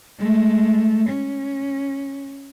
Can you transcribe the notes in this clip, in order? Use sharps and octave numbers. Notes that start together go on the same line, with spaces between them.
G#3 A3
C#4